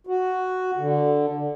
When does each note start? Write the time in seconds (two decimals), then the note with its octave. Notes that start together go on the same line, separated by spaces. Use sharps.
0.07 F#4
0.77 D3